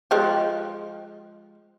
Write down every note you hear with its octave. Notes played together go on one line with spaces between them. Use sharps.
F3 G#3 G4